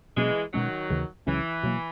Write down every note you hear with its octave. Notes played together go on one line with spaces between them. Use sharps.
B2 E3 F#3 G#3 A#3 C#4
B2 D#3 F#3 G#3 C#4
D#2 C#3 E3
C#2 C#3 E3 F#3 C#4
B2 F#3 A#3